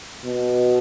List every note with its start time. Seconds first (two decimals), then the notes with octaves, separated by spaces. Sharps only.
0.24 B2